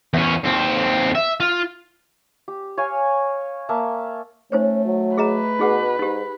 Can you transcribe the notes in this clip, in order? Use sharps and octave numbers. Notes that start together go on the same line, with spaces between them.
E2 C#4
D#2 C4
E5
F4
G4
C#5 F5 G#5
A#3 E5 A5
A3 C#4 D#4 C5 C#5
F#3
G#4 B4 D#5 A#5
B2 D#4 G#4 F#5
G#2 D#4 G4